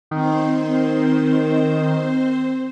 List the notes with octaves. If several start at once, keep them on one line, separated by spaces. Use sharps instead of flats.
D#3 C4 C5